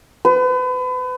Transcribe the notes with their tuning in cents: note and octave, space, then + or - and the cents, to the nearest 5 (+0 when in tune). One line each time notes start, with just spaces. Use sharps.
B4 +35